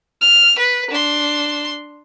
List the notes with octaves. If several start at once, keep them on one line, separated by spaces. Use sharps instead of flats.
F6
B4
D4 C6